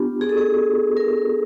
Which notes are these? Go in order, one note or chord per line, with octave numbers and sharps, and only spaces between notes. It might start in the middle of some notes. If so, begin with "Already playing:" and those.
Already playing: B3 D4 F4 G4
G#4
A4
G#4
A#4